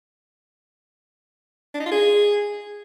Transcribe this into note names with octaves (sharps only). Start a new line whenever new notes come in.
D4
D#4
F4
G#4